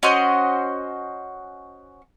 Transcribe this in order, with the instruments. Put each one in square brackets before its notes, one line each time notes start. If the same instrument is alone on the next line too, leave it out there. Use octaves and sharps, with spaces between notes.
[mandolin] C#4 F#4 C5 D#5